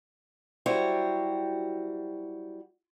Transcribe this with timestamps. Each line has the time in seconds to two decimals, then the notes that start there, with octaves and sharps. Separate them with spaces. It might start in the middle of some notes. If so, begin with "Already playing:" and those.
0.66 F#3 G3 E4 F#4 G4 C5